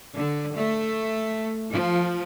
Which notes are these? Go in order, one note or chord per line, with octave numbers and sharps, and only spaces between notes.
D3
A3
F3